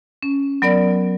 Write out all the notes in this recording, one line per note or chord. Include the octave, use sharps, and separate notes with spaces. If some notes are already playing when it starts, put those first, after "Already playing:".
C#4
F#3 B3 A#4 D5